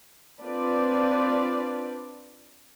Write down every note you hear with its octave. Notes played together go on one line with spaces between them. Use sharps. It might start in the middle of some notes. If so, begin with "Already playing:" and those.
C4 D4 F4 B4 D5